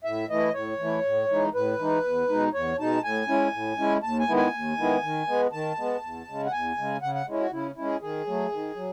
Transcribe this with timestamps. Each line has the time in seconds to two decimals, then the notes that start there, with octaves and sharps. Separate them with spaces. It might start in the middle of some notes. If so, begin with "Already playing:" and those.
0.04 A2 E5
0.30 E3 A3 E4 D#5
0.54 A2 C#5
0.79 E3 A3 E4
1.05 A2
1.29 E3 G#3 D#4
1.55 A2 B4
1.79 E3 G#3 D#4
2.04 E2
2.29 B2 G#3 D#4
2.54 E2 C#5
2.78 B2 G#3 D#4 A5
3.04 A2 G#5
3.28 G#3 C#4 E4
3.53 A2
3.78 G#3 C#4 E4
4.03 D#2 A5
4.20 G#5
4.28 D#3 G#3 B3 E4
4.37 G#5
4.53 D#2
4.77 D#3 G#3 B3 E4
5.03 D#3
5.28 G#3 B3
5.52 D#3 A5
5.78 G#3 B3
6.03 E2
6.28 C#3 G#3
6.45 F#5
6.52 E2 G#5
6.77 C#3 G#3
7.02 C#3 F#5
7.15 F#5
7.26 G#3 C#4 E4
7.40 F#4
7.51 C#3 E4
7.76 G#3 C#4 E4
7.85 G#4
8.01 D#3 G#4
8.26 F#3 A3
8.52 D#3
8.76 F#3